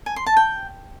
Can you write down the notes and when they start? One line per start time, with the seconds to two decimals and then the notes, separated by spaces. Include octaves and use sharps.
0.06 G#5
0.16 C6
0.26 A5
0.37 G5